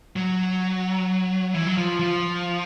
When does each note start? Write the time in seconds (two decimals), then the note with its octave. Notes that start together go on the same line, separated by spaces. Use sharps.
0.16 F#3
1.54 E3
1.67 F#3
1.77 F3
2.00 F3